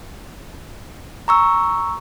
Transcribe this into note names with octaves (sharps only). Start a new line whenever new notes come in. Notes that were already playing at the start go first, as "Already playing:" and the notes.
A#5 C#6 E6